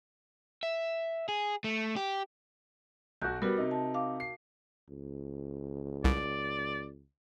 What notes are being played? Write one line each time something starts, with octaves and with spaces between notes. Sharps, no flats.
E5
G#4
A3
G4
B1 F#4 F#6 G6
G3 B3 F#4 A#4
C3 D#4
A5
F5 D6
C7
C#2
C2 D5